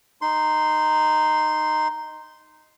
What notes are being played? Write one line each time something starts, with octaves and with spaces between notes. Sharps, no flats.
D#4 C6